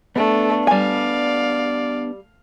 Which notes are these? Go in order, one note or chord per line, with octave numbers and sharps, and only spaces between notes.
A3 B3 D4
G3 D5 F5 G#5